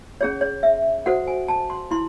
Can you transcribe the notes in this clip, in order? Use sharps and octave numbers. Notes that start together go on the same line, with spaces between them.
C#4 G#4 C#5
C#5
E5
F#4 A4 C5 F#5
G#5
A5
C6
E4 C6